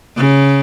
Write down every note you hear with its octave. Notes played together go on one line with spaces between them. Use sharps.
C#3